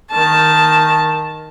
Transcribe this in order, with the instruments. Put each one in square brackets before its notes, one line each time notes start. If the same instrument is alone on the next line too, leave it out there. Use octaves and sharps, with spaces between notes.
[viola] D#3 A5